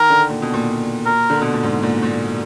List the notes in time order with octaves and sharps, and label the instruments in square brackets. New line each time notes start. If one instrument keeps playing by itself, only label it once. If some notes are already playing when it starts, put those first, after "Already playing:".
Already playing: [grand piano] D#3 [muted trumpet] A#4
[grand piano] D3
A#2
B2
A#2
[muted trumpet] A#4
[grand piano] D3
B2
A#2
G#2
A#2
A#2